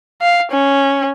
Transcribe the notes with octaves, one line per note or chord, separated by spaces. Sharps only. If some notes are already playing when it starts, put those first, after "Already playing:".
F5
C#4